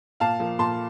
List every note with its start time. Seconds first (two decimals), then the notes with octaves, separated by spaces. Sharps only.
0.20 A#2 F5 A5
0.40 F3 A#3
0.59 A#2 A5 C6